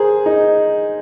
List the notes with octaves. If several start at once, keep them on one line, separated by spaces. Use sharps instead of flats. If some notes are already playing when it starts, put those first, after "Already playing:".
Already playing: G#4 A#4 C5
D#4